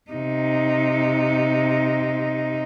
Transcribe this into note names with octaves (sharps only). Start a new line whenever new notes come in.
C3 D#4